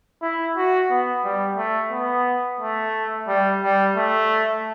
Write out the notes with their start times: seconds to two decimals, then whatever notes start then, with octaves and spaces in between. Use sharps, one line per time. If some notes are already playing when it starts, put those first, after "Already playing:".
0.22 E4
0.56 F#4
0.90 B3
1.24 G3
1.57 A3
1.92 B3
2.60 A3
3.28 G3
3.62 G3
3.96 A3